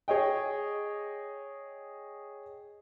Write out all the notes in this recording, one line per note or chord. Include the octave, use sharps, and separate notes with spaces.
G#4 C#5 D#5 G5